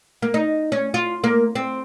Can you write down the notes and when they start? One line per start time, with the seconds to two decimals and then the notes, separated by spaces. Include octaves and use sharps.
0.22 A#3
0.34 D#4
0.72 C#4
0.94 F4
1.24 A#3
1.55 C4